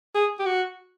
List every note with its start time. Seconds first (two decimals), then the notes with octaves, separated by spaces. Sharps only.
0.15 G#4
0.39 G4
0.46 F#4